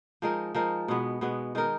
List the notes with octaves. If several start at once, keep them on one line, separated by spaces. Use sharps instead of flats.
F3 G#3 D#4 A#4
F3 G#3 D#4 A#4
B2 G#3 B3
B2 G#3 B3
D#3 G#3 D#4 A#4